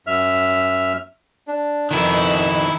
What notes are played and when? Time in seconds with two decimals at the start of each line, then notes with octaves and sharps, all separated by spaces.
0.07 F#2 E5 F6
1.48 D4
1.91 F2 B2 D#3 E4